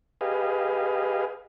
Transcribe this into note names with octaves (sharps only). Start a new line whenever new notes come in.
G4 G#4 B4 D#5 F5